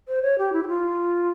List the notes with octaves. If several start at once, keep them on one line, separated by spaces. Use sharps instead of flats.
C5
C#5
G4
E4
G4
F4